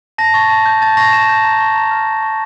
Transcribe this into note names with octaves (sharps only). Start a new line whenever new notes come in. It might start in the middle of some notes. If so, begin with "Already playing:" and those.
A5 A#6
C#6 A6
A5
G6
A5 A6
C#6 A#6
A5 E7
G6
A#5
C#6
A#5
F6
A#5
C#6